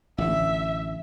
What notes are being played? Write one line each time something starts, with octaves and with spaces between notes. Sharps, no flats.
A1 D3 E5